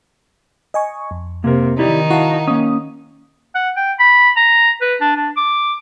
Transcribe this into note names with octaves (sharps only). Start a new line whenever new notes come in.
D#5 G#5 C#6
F2
C3 A#3 A#4
D#3 D#4 E4 G4 D5
E4 F#4 F5 F#5 A5
A#3 C#4 D#6
F#5
G5
B5
A#5
B4
D4
D4
D6